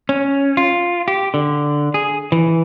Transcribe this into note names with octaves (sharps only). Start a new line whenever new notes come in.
C#4
F4
G4
D3
G#4
E3